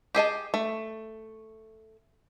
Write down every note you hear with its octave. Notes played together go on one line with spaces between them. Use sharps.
G4 G#4 D#5 A5
A3